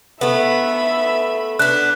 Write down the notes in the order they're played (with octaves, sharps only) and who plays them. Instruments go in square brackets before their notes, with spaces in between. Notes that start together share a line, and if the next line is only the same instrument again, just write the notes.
[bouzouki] A3 B3 [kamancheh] E5 B5
[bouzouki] B3 D4 [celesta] F#6